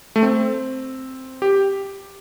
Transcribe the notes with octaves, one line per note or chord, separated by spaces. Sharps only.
A3
C4
G4